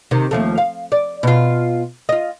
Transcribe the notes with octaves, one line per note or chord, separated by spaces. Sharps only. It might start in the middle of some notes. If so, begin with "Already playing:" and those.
C3 D#3
D#2 F3 A3
F5
D5
B2 F4
F4 D#5